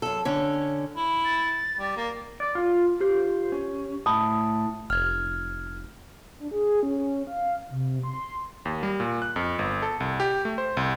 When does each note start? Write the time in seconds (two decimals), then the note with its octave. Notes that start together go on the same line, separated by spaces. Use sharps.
0.02 F#2 A4
0.25 D3 C#4
0.97 E4
1.25 A6
1.78 G3
1.97 A#3
2.40 D5
2.55 F4
3.00 F4 G4 C5
3.52 C#4
4.06 A2 A5 B5 D#6
4.90 F1 F6 G#6
6.40 D4
6.51 G#4
6.83 C#4
7.27 F5
7.70 C3
8.04 C6
8.65 D#2
8.83 G3
9.00 A#2
9.22 F#6
9.36 F2
9.59 G1
9.82 A4
10.00 C2
10.20 G4
10.45 A3
10.58 C5
10.77 C2